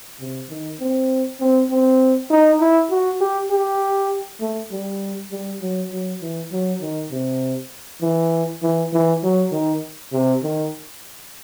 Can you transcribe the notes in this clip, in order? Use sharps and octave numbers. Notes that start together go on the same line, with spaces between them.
C3
D#3
C4
C4
C4
D#4
E4
F#4
G4
G4
A3
G3
G3
F#3
F#3
E3
F#3
D#3
C3
E3
E3
E3
F#3
D#3
C3
D#3